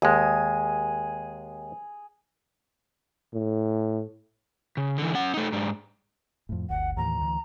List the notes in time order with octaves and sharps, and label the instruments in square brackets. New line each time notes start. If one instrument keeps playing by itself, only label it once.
[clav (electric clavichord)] D#2 G#3 [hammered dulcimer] G#4
[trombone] A2
[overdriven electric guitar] C#3
D3 E3
C#4 F#5
A3 D#4
G#2 D4
[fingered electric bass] F2 A2
[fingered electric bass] G1 D2 [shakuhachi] F#5
[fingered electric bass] D#2 A2 E3 [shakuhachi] A#5
[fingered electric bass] D2 E3